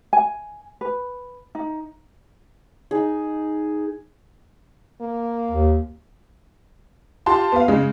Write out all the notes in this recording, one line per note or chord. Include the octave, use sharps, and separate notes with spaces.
G#5
B4
D#4
D#4 G#4
A#3
D#2
F4 G4 A5 C6
B3 F5
C#3 G#3